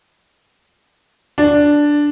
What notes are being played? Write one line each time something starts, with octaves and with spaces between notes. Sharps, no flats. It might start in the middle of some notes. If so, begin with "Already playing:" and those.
D4